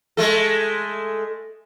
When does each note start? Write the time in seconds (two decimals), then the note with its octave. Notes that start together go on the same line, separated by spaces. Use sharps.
0.17 G#3 A3 A4